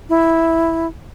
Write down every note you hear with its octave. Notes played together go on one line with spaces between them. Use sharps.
E4